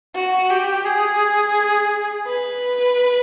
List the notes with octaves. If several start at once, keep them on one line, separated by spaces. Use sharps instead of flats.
F#4
G4
G#4
B4